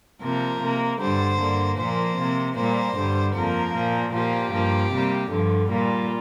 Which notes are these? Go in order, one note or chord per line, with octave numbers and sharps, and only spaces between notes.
C3 F3 A#3 A#4
C3 A#3
G2 D3 G3 C5
G2 D3 A#3
A#2 F3 A#3 C5
C3 A#3
A#2 G3 A#3 C5
G2 D3 G3
F2 F3 A#3 A#4
A#2 F3 A#3
A#2 F3 A#3 G4
G2 F3 A#3
C3 G3 A#3
G2 D3 F3
A#2 G3 A#3 F4